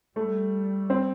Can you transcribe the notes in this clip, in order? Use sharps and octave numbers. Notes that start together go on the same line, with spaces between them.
G3 A3
C4